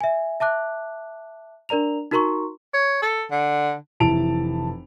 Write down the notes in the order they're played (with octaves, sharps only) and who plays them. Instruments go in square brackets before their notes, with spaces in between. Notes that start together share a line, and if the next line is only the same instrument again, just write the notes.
[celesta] E5 G#5
E5 A5 D6 F#6
D4 A#4 D5 A#5 F7
D#4 F#4 A#4 A#5 C6 C#6
[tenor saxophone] C#5
A4
D3
[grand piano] F1 E3 E4 A5 D7 F7